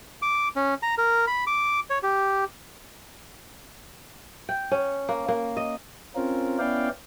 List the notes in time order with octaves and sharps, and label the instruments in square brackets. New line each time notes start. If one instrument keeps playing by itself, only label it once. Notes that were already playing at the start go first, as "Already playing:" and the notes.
[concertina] D6
C#4
A#5
A#4
B5
D6
C#5
G4
[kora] G5
C#4
A#3
A#3
D#5
[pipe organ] C4 C#4 F4 A#4
B3 C#4 E4 D5 F5 G5